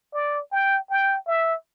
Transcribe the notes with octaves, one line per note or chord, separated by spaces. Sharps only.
D5
G5
G5
E5